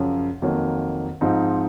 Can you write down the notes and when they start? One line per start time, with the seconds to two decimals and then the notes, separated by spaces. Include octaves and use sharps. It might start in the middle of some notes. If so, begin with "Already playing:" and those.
Already playing: F#2 C#3 F3
0.42 F2 D#3 F#3 A#3
1.21 G#2 F3 C4 D#4